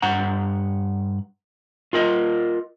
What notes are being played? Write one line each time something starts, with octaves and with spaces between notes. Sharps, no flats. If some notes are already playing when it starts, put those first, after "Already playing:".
G2 F#5 A#5
F4 A#4 D#5